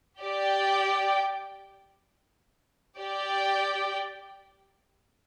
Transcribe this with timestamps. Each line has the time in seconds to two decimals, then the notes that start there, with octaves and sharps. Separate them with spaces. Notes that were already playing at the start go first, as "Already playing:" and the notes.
0.21 G4 D5 G5
2.98 G4 D5 G5